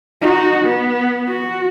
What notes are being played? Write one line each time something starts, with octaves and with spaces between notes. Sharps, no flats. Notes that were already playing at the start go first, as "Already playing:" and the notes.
D#4 F#4
B3
F#4